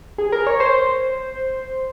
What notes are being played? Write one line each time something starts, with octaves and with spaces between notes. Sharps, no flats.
G#4
A#4
C#5
C5